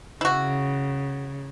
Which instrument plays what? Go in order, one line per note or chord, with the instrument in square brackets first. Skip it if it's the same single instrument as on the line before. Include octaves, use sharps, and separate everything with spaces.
[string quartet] C#3 [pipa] E4 F#4